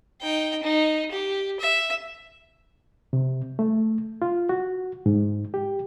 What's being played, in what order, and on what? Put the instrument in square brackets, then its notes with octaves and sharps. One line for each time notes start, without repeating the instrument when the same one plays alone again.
[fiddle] D#4 G5
D#4
G4
E5
[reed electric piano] C3
A3
F4
F#4
G#2
G4